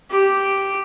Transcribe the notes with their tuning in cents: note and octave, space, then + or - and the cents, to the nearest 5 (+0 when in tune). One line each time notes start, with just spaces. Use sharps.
G4 -5